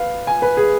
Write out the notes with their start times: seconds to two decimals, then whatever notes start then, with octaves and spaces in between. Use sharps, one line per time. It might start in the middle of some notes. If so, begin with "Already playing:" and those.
Already playing: B4 F5
0.27 G#5
0.42 B4
0.57 G#4